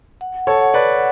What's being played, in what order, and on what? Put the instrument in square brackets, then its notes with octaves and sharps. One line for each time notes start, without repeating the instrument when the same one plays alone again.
[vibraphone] F#5
[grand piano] A4 C#5
[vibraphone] F#5
[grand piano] B4 D5